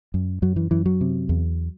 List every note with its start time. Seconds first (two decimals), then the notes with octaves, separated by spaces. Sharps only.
0.14 F#2
0.42 F#2 F#3
0.56 E3
0.71 F#2 E3
0.86 F#3
1.01 C3
1.29 E2